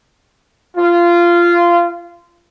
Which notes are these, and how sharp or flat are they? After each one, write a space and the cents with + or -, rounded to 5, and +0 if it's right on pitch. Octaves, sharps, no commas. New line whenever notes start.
F4 -15